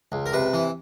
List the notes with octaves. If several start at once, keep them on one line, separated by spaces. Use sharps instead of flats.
C#2
A#4
C3 B4
E3